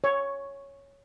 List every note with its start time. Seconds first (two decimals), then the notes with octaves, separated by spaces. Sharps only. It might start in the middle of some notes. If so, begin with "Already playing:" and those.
0.04 C#5